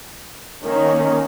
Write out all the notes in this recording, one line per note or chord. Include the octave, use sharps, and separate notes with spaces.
D#3 A#3 C#4